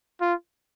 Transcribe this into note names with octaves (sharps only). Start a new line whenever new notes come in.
F4